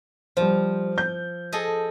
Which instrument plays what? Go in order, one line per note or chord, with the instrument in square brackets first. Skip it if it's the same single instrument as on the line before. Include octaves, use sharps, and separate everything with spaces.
[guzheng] F3 [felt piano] G3 C5
[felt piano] G6
[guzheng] G#4 A4 D#5